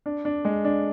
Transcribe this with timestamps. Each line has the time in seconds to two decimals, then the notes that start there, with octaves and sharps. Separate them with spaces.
0.06 D4
0.25 D4
0.45 G#3
0.65 D4